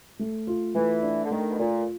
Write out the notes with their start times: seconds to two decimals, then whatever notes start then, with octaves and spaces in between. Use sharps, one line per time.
0.19 A3
0.47 F4
0.75 E3 A3
1.02 D4
1.24 D3
1.31 D#3 A3
1.51 B2
1.58 A#2 F4